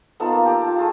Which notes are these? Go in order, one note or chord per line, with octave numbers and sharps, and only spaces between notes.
B3 D#4 F4 A4
A#3
G4 A4 A#5
F4 A5
A3 F4 G#4 A4